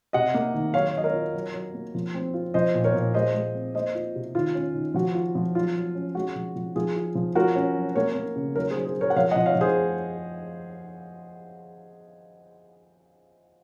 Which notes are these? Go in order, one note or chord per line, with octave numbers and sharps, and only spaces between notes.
C3 D#5 F#5
A#3
D#3
F#3 C#5 F5
F#3 D#5
A#4 C#5
F4
F#3
F#3
A#3
F3
C4
F4
F3 C5 D#5
A#2
A#4 C#5
A#2
G#3 C5 D#5
G#3
C4
A#3 C5 D#5
F4
C3
D#3 F4
C#4
D#3
F3 F#4
F4
F3
F#3 F4
F#3
C#4
G#3 F#4
F3
F3
F3 F4 G#4
F4
F3
F4 F#4 A#4
C#4
F#3
A#3 A#4 C#5
A#3
C#3
F#3 A#4 C#5
G#4 C5
F#3
G#4 C5
F#3
A#4 C#5
F#5
F3 C#5 F5
D#5 F#5
F3
C#5 F5
F3
G#4 C5